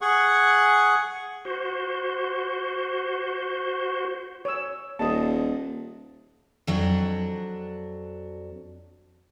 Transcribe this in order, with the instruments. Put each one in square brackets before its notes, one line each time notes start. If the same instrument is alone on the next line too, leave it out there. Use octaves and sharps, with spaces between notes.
[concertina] G#4 F#5 C#6
[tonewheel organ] F#4 C5
[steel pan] C#5 E6
[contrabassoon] D#1 [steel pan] D#5 A5
[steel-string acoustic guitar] F2 F#3 D4